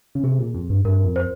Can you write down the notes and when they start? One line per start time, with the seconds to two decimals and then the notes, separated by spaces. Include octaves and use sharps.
0.15 C#3
0.24 C3 G#4
0.39 A#2
0.54 F2
0.70 G2
0.85 G2 A#4
1.05 F2
1.16 C5